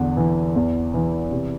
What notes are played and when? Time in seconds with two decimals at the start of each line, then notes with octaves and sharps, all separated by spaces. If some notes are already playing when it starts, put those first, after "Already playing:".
Already playing: E2 D3
0.17 E3
0.56 E2
0.94 E3
1.31 C3